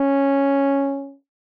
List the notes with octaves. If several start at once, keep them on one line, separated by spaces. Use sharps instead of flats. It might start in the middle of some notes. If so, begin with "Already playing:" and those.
Already playing: C#4